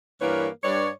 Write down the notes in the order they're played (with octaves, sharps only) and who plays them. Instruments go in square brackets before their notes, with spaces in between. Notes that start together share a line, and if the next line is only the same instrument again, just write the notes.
[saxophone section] G2 E3 A#3 A#4 B4 C#5
G2 C#5 D5